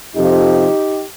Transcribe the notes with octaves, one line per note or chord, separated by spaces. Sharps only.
F2 C3 F3 D#4 G4